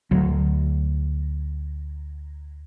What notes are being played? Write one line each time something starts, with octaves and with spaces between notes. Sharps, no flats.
D2 F#3